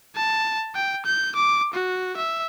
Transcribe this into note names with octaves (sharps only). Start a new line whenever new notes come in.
A5
G5
G6
D6
F#4
E5